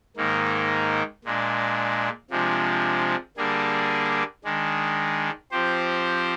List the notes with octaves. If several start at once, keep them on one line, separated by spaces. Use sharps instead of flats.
G#2 D#3 A#3
A#2 G#3 D4
C3 F3 G#3 D4
D3 G3 A#3 D4 G#4
D#3 G#3 D4
F3 C4 G4 C5